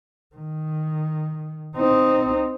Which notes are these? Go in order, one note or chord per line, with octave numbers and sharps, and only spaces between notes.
D#3
C4 D#4